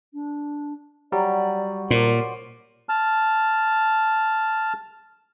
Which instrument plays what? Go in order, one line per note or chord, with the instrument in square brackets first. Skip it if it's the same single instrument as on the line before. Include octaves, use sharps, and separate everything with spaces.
[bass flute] D4
[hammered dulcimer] F#3 [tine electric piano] G3 [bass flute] D5
[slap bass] A#2 [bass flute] A#4 [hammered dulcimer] C5 D5
[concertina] A5 F6